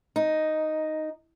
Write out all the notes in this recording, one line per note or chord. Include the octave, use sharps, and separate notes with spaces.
D#4